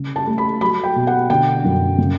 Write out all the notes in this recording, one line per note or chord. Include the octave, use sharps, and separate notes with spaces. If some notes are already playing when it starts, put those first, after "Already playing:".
Already playing: C#3
A5
A3
B5
F#3 B5
G5
B2
F#5
D3 G5
F#2
C#3